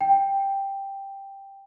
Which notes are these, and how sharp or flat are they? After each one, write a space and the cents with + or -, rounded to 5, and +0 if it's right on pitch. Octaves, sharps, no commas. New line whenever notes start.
G5 +5